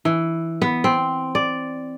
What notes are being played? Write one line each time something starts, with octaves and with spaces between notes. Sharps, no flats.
E3
B3
C4
D5